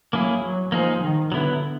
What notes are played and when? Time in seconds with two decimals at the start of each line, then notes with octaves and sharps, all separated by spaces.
0.13 F#3 A#3 C#4 E4 G#4
0.43 F#3
0.72 F3 A#3 D#4 G#4
1.02 D#3
1.32 D3 F#3 B3 E4